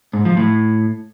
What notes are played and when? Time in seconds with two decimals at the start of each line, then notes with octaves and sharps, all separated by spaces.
0.13 G#2
0.25 F3
0.37 A2